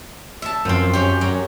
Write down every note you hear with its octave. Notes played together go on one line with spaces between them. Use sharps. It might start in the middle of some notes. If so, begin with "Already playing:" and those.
E5 A5
F#2 F3 C4
C#4 G4
F#3